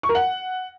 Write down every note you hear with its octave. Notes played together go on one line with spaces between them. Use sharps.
C#6
A#4
F#5